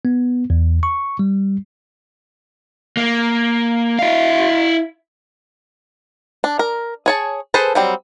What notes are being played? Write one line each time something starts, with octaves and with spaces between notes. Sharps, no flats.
B3
E2
C#6
G3
A#3
E4 F5
D4
A#4
G#4 C#5 A5
G#4 A4 B4 C5 A5
F#3 G3 C4